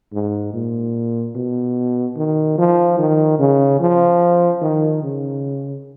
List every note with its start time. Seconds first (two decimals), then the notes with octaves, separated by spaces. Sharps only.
0.13 G#2
0.54 A#2
1.35 B2
2.17 D#3
2.58 F3
2.99 D#3
3.39 C#3
3.80 F3
4.62 D#3
5.03 C#3